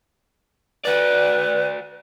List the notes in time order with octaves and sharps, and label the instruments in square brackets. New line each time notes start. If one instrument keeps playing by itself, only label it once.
[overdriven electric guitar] F#4 D5 [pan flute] B4